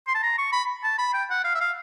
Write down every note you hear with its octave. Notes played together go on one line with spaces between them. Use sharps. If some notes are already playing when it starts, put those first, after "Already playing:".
C6
A5
A#5
C#6
B5
A5
B5
G5
F#5
F5
E5
F5